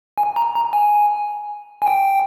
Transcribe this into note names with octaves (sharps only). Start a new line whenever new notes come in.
G#5
A#5
A#5
G#5
G#5
G5